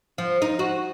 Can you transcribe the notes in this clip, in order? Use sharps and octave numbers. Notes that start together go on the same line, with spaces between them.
F3
D#4
F#4